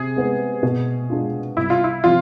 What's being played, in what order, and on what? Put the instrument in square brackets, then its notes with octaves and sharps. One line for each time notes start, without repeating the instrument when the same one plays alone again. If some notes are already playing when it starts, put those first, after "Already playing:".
Already playing: [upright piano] C3 [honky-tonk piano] G#4
[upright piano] G#3 B3
B2
G#3 D4 F4
[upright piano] C2 [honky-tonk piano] E4
[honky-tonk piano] F4
E4
[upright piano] C3 F3 [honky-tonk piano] F4